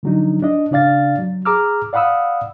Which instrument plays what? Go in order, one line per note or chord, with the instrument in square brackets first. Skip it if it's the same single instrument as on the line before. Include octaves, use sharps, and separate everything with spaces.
[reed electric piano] D3 F3 F#3 D4 D#4
D4 D#5
C#3 D4 D5 F5 A6
F#3
G#4 A#5 D6 E6 F6
D5 F5 F#5 B5 D#6 E6